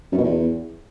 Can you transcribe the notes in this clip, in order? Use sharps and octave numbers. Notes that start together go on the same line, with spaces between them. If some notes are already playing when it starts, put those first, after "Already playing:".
F#2
B2
E2